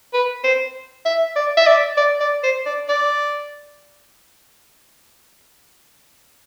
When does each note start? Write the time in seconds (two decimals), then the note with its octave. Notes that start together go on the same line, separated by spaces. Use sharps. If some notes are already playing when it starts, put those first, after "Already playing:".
0.13 B4
0.44 C5
1.06 E5
1.36 D5
1.57 E5
1.67 D5
1.97 D5
2.20 D5
2.43 C5
2.66 D5
2.89 D5